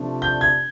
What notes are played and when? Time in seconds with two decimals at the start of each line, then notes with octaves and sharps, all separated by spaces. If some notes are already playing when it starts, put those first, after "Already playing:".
Already playing: C3 F3 A3 D4
0.22 G6
0.41 G#6